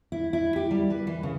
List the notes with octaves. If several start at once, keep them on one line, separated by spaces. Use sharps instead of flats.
E4
E4
G4
G3
B4
E3
C#3